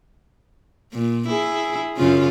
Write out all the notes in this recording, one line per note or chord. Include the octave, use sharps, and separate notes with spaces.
A#2
E4 G#4
F#2 C#3 F4